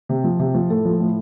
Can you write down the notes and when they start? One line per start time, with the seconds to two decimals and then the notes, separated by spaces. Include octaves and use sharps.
0.09 C3
0.24 F3
0.39 C3
0.55 F3
0.69 A2 A4
0.85 F3
1.00 A2